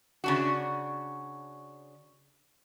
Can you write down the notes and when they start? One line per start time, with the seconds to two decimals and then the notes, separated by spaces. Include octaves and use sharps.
0.24 C#3 D4 F#4